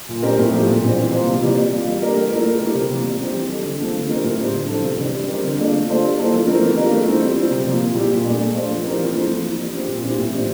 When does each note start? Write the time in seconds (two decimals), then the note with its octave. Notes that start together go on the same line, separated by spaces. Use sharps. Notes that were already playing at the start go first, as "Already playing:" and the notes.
0.09 A#2
0.22 G3 C4 G4 A#4
0.38 A2
0.52 F3 A3 E4 G4
0.68 A#2
0.82 G3 C4 G4
0.97 E3
1.12 A#3 F4 C5
1.27 C3
1.42 E3 G3 A#3
1.57 G3
1.71 A#3 F4
1.87 G3
2.01 D4 G4 A#4
2.16 A3
2.31 E4 A#4
2.46 A3
2.60 E4 G4 A#4
2.75 C3
2.90 E3 A#3
3.05 G3
3.20 C4 G4
3.35 E3
3.49 G3 D4 A4
3.64 D3
3.79 A3 C4 F4 A4
3.94 D3
4.09 A3 C4 G4 A#4
4.24 A2
4.39 G3 C4 G4 C5
4.53 D3
4.68 F3 C4 E4 A4
4.84 C3
4.97 E3 G3 C4 E4
5.13 G3
5.28 C4 G4 A#4
5.43 D3
5.58 A3 D4 F4
5.72 A3
5.87 D4 F4 A4 C5
6.02 G3
6.17 A#3 E4 A4 C5
6.32 E3
6.46 A3 C4 E4 A#4
6.62 E3
6.77 G3 D4 F4 A#4
6.92 A3
7.06 C4 E4
7.21 G3
7.36 C4 E4
7.51 C3
7.65 F3 A#3
7.80 A#2
7.95 G3 A#3 E4 G4
8.10 A#2
8.25 A3 D4
8.39 A3
8.54 D4 F4 C5
8.69 F3
8.84 C4 E4 G4 A#4
8.98 E3
9.14 A3 C4 E4
9.29 F3
9.43 A#3 E4
9.58 G3
9.73 C4 G4
9.88 A#2
10.03 G3 C4 E4 G4
10.18 A2
10.32 E3 G3 C4